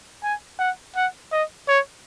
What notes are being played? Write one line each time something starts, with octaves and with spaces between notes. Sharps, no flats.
G#5
F#5
F#5
D#5
C#5